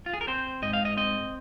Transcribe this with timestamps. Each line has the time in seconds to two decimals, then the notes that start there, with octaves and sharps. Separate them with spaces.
0.06 F4
0.13 G#4
0.21 A#4
0.27 C4 C5
0.62 G#2 D#5
0.73 F5
0.85 D#5
0.97 C4 D#5